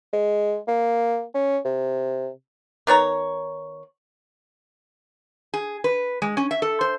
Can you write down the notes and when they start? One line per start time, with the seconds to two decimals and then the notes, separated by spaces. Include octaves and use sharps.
0.13 G#3
0.68 A#3
1.34 C#4
1.65 C3
2.87 D#3 B3 C#5 A#5
5.54 G#4
5.84 B4
6.22 G#3
6.37 C#4
6.51 E5
6.62 A4
6.81 C5